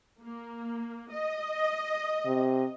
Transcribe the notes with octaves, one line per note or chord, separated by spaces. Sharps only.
A#3
D#5
C3